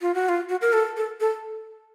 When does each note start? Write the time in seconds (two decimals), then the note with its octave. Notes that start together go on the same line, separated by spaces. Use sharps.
0.01 F4
0.14 F#4
0.29 F4
0.49 F#4
0.61 A#4
0.73 A4
0.97 A4
1.20 A4